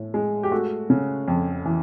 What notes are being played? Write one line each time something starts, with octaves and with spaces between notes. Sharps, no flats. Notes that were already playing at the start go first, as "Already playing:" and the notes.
Already playing: A2
G#3
G4
A3 F#4
C#3
F2
E3